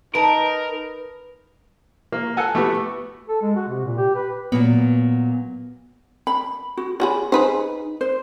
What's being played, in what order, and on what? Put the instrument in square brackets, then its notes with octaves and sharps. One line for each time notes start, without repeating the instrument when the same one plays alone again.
[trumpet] D#4 [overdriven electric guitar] A#4 [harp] B4 [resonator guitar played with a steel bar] A5
[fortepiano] A#3
A4 F#5 G#5
A3 B3 F#4 G4
[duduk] A4
G#3
F#4
C3
A#2
G4
B4
[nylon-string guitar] A#2 F#3 [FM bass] B3
[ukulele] B5
F#4
[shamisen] F4 F#4 G#4 [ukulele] C#5 B5
[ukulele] D#4 [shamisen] G#4 B4 C5
[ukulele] C5